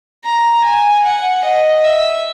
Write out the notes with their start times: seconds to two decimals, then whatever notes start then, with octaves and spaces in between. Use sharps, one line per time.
0.25 A#5
0.64 G#5
1.04 F#5
1.45 D#5
1.84 E5